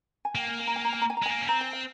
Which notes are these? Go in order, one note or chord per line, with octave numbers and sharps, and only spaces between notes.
G#5
A#3 G5
G#5
G#5
A#5
G#5
A#5
G#5
A#5
G#5
A#5
G#3
A#3 G#5
C#4
C4 A#5
G#5
F5